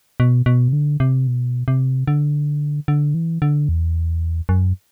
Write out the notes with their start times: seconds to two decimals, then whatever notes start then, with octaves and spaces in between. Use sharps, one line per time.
0.20 B2
0.46 B2
0.68 C3
0.73 D3
1.00 C3
1.27 B2
1.68 C3
2.08 D3
2.88 D3
3.14 E3
3.42 D3
3.69 E2
4.49 F#2